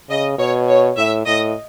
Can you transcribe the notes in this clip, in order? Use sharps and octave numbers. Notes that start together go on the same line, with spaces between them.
C#3 D#5
B2 C#5
C#5
A2 E5
A2 D#5